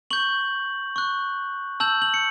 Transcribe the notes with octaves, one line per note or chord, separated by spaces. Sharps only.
C#6 G6 F#7
C#6 F#6
A5 E6 G6 F#7
F#7
C#7